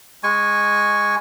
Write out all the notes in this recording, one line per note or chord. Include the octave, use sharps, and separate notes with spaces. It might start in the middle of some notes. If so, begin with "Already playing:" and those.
G#3 G#5 C#6